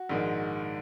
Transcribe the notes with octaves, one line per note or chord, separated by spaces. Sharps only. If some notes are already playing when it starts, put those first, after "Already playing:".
Already playing: F#4
A#1 G#2 D#3 G#3